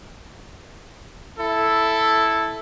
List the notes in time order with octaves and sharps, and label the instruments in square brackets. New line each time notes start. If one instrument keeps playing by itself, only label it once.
[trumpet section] E4 A4